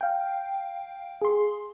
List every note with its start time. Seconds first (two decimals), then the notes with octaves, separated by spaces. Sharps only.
0.01 F5 G5
1.22 G#4 C6